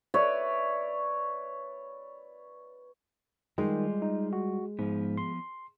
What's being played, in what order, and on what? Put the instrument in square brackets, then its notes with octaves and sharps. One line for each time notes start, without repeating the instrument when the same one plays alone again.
[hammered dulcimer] B4 C#5 D5 E5
[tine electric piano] D#3 [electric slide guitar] G3 F4 [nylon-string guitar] G#3
[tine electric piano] D#4
F#4
[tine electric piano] G#2 [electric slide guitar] F3 B3
[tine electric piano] C6